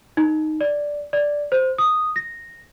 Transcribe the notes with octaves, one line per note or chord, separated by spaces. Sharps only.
D#4
D5
D5
C5
D#6
A#6